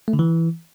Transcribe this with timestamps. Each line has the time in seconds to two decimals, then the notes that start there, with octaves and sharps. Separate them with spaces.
0.08 A3
0.13 D3
0.19 E3